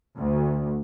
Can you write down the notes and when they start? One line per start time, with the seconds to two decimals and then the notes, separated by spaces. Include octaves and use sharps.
0.17 D2